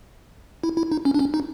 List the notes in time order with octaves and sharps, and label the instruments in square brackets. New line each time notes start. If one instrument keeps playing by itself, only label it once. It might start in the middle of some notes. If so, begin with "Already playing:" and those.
[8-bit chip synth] E4
E4
D#4
C#4
D4
C#4
D#4